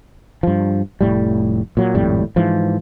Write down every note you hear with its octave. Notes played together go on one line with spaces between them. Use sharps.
G2 F3
F1 A2 G3
A#2 F#3
G#1 F2 A2 G3
G#2 E3 F3